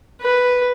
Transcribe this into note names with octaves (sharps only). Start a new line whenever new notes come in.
B4